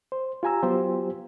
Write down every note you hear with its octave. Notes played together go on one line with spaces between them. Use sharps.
C5
F4 G4 G#5 A#5 E6
F#3 B3 F4 G4 C5